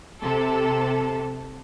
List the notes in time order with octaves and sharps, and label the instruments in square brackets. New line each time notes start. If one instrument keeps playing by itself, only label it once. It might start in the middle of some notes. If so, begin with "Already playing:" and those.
[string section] C3 A4